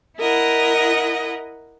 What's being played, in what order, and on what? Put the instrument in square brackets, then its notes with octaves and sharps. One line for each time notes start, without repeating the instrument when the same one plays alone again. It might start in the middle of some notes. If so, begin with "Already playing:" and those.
[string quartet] E4 A#4 D#5 F#5